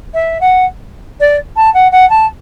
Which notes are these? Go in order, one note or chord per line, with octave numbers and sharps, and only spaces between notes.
E5
F#5
D5
A5
F#5
F#5
A5